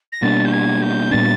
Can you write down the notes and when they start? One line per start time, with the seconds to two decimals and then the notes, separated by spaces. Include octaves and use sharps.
0.12 A#6
0.22 B2 G3 A#3 D4 A6
0.45 G6
0.52 G#6
0.82 G6
1.11 A#2 G3 B3 D4 A6